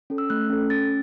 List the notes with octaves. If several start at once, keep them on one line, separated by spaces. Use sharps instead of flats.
C#4 A4
E6
A3 F#6
C#4 A4
C#4 A6